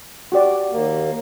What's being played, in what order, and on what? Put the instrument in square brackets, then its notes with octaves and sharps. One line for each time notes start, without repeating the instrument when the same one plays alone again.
[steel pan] F#4 G4 D5
[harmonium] D#2 A#3